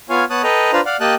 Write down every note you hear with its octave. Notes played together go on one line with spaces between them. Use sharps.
B3 F4 C#5 F5 G#5
B3 C#5 A5 D#6 F#6
A4 B4 D#5 G5 A#5
D4 F4 B4 C5 A#5
D5 F5 F#5
A#3 G4 D#5 G5 A5 F#6